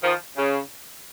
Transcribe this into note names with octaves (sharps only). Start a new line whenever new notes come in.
D#3 F3
C#3